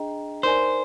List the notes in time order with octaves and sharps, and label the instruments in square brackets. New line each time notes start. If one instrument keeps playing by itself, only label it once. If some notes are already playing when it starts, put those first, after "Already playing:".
Already playing: [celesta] D4 G#4 D#5 G5 A#5
[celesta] D#4 A#4 D5 G#5 [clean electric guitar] C5